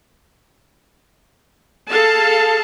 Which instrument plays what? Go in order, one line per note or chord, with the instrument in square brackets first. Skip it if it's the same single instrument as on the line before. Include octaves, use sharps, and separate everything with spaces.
[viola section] G#4 A4 F5 A5